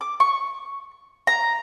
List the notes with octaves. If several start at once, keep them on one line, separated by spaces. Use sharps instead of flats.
D6
C#6
A#5